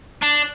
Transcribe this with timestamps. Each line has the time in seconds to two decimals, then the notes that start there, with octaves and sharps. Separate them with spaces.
0.23 D4